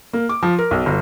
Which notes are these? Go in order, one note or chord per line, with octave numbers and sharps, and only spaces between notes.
A#3
D6
F3
A#4
B1
G1